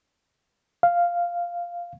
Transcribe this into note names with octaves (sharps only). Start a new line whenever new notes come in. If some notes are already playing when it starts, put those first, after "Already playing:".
F5